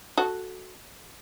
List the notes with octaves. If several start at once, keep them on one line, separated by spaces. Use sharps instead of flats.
F#4 A4